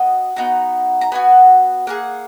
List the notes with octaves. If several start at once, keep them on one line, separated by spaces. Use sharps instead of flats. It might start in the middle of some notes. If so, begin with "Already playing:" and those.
Already playing: B3 F#4 D#5
B3 D#4 F#4 A#5
A#5
B3 D#4 F#4 G#5
A#3 F4 G#4 F#5